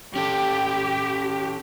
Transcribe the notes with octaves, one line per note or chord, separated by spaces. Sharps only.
C#4 G4 A4